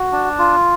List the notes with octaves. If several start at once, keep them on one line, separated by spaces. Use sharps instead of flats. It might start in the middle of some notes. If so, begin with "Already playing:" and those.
Already playing: F#4
D4
F4